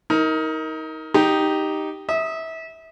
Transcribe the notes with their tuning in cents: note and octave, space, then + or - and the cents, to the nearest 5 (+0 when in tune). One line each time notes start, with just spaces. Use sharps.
D#4 +30 A#4 +0
D#4 +0 G4 +0
E5 -25 D#6 +0